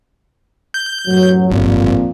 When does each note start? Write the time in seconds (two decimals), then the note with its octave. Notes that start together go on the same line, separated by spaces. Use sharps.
0.74 G6
1.07 A1 F#2 F#3
1.50 G1 F2 A#2